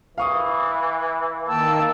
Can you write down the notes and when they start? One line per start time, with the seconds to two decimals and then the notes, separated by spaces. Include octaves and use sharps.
0.18 E3 F5 C#6 D#6
1.48 D#3 A#3 G5 A5 E6